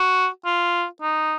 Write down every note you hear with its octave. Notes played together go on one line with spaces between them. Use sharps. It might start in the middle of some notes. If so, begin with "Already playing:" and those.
Already playing: F#4
F4
D#4